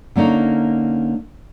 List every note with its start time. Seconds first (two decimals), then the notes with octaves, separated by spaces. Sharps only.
0.16 D3 A#3 C#4 D#4